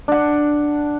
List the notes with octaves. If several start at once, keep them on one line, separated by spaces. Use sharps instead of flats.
D4 F#5